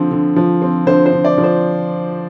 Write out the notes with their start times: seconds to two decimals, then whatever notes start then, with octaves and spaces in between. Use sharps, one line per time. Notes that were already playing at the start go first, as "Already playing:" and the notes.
Already playing: D3 F3 C4
0.11 D3
0.36 F3
0.62 C4
0.86 D3 C5
1.06 C5
1.12 D3
1.25 D5
1.38 F3
1.44 C5